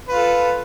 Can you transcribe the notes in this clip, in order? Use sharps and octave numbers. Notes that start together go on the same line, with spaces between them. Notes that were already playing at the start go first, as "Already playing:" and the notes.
F4 A4 B4